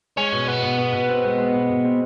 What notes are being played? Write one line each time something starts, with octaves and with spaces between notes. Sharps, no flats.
G#3 C#4
B2
B2 B3
B2
B2
B2
C4
G#3
G#3
B2
B2
C4